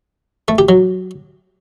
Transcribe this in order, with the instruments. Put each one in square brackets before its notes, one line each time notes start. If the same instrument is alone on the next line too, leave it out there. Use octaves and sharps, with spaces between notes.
[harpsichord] A3
G4
F#3